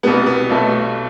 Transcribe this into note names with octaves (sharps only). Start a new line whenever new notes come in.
C2 B2 G3 B3
B3
B1 B2 A3